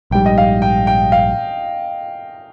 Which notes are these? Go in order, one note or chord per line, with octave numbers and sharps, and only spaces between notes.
A#1 G#2 G3 G5
D#5
F5
G5
G5
F5